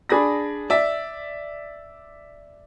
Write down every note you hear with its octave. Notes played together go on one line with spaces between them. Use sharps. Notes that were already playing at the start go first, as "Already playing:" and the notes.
D4 G#4 D5 B5 A#6
D5 E5